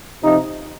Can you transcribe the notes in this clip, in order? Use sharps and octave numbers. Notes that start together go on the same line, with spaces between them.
C3 F3 D#4